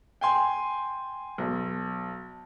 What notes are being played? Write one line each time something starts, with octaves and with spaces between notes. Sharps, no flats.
G5 G#5 C6
B1